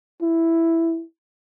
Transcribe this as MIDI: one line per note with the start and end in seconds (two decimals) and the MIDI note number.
0.22 1.03 64